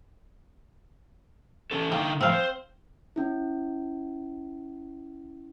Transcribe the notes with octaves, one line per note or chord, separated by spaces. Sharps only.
E3 C#4 A4
D3 A#3 D#4 G5
A2 F3 C4 F5
C5
C#4 E4